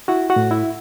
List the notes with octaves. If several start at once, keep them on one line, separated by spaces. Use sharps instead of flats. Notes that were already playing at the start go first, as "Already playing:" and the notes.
E4 F#4 F#5
F#4 F#5
A2
E4 E5